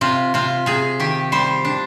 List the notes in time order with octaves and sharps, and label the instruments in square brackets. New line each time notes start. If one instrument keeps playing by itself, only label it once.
[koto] C3 F4
C3 F4
C3 G#4
D#3 G4
G3 C5
D4